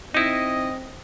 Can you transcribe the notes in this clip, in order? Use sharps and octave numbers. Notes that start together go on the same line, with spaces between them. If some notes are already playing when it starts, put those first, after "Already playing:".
C4 D#4 E4 D#5